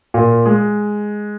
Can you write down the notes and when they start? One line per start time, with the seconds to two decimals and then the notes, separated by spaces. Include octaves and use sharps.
0.14 A#2
0.46 G#3